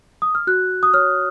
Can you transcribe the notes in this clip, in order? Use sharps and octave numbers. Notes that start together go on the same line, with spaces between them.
D#6
F6
F#4 F#6
D#6
C#5 F6